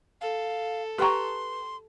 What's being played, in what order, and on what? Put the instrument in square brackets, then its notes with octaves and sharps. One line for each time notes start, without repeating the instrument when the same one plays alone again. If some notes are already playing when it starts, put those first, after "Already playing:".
[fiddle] A4 [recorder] F5
[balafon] G4 C#6 [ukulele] B4 G5 A#5 [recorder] C6